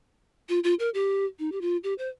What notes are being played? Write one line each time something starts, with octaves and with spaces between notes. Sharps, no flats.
F4
F4
A#4
G4
D#4
G4
F4
G4
C5